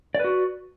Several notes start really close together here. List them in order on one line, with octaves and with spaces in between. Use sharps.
D5 B4 F#4